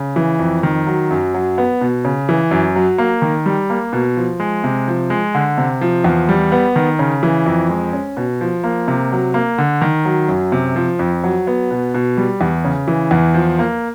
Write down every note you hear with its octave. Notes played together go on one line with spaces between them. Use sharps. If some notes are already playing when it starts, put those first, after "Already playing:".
Already playing: C#3
E3
F2
D#3
F#3
F#2
F#3
B3
B2
C#3
E3
F#2
F#3
A#3
D#3
G3
A#3
B2
F3
G#3
C3
F3
G#3
D3
C3
F3
E2
G3
B3
D#3
C#3
E3
F2
G#3
C#4
B2
F3
A#3
C3
F#3
A#3
D3
D#3
F#3
F#2
C3
F3
F2
F#3
B3
B2
B2
G3
E2
C#3
E3
E2
F3
A#3